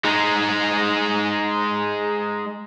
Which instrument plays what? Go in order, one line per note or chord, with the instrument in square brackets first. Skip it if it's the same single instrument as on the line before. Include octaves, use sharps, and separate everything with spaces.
[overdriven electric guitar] G#3 D#4